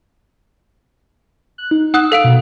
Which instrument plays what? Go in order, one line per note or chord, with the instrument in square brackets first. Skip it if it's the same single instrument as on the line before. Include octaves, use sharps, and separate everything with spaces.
[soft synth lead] F#6
D#4
[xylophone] F#5 D#6 F#6 [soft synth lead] E6
[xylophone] A4 F5 D7
[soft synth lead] B2